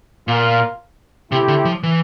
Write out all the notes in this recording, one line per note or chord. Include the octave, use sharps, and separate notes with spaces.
A#2 F4 A#4 F5
C3 A3 C4 E4 G4
D3
F3
E3